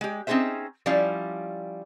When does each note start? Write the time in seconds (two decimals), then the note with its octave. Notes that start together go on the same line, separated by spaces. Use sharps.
0.01 G#3 G4
0.27 C4 C#4 D#4 G#4 C5 E5
0.86 F3 G3 C#4 E4 D5 F5